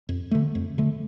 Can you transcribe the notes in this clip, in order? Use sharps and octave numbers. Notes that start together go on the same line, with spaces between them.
F2
D3 A3
F2
D3 A3